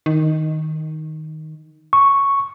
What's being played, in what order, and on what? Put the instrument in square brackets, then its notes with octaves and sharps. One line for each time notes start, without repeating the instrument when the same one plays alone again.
[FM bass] D#3
[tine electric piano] C#6